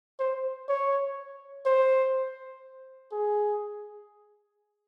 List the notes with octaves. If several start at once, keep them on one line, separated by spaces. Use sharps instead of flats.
C5
C#5
C5
G#4